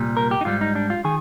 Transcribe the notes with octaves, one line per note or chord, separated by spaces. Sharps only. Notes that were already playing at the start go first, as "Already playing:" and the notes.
Already playing: C2 A#2 G3
A#4
G4
D#4
G#2 G3 F4
D#4
D4
F4
D#3 G#4